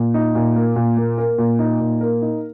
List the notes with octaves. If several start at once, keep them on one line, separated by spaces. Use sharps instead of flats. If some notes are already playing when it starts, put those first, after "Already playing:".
Already playing: A#2
D#4
A#2
A#3
A#2
A#3
A#4
A#2
D#4
A#2
A#4
D#4